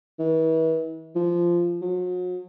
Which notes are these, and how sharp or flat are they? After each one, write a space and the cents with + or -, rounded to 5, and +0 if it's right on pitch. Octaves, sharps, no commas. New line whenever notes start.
E3 -40
F3 -15
F#3 -40